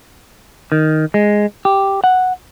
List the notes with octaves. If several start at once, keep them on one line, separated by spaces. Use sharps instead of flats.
D#3
G#3
G4
F#5